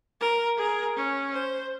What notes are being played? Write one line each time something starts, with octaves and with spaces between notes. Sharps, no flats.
A#4
G#4 A#4
C#4
C5